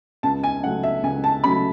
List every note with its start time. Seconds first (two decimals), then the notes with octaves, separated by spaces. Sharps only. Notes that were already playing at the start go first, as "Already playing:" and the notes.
0.23 C#2 A5
0.44 G#5
0.63 C#3 F#3 A3 F#5
0.83 E5
1.03 C#2 G#5
1.24 A5
1.44 C#3 F#3 A3 B5